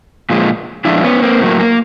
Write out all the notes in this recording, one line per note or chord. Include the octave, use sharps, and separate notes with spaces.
A#2 F3 G#3
A#2 F3 G#3 D4 E4
B3 C#4
A#3 C4
A2 F#3 A#3
A#3